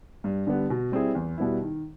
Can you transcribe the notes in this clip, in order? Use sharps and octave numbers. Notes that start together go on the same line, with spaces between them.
G2
D3 G3 B3
B2
G3 C4 E4 G#4
E2
B2 G3 B3 E4
D#3